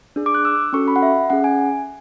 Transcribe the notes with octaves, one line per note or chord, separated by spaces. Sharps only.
D4 G#4
D6
F#6
E6
C#4 F#4 A4 C#6
B5
F#5
E5
C#4 G#4 F#5
G#5